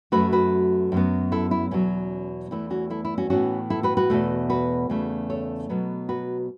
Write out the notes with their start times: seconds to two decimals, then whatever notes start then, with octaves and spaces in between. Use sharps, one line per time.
0.12 F#2 F#3 A3 F#4 B4
0.33 F#4 B4
0.92 F#2 F#3 B3
1.32 E4 A4
1.51 E4
1.71 E2 B2 F#3 C#4
2.51 E2 E3 A3 E4
2.70 C#4 F#4
2.90 E4 A4
3.05 E4
3.18 C#4 F#4
3.30 A2 E3 B3 C#4 F#4
3.70 E4 A4
3.83 F#4 B4
3.97 F#4 B4
4.10 E2 B2 A3
4.50 F#4 B4
4.90 E2 C#3 A3
5.30 A4 C#5
5.69 B2 F#3 B3
6.09 F#4 B4